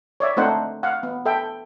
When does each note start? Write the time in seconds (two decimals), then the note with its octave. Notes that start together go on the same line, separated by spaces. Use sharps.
0.20 C#5 D5 E5
0.37 A3 C4 D4 D#4 C5 F#5
0.83 F5 F#5
1.03 B3
1.25 A4 E5 G5